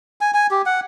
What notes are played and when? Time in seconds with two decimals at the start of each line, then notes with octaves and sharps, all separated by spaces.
0.21 G#5
0.34 G#5
0.51 G4
0.66 F#5